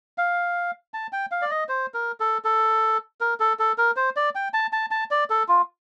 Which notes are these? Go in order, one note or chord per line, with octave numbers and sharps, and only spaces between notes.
F5
A5
G5
F5
D5
D#5
C5
A#4
A4
A4
A#4
A4
A4
A#4
C5
D5
G5
A5
A5
A5
D5
A4
F4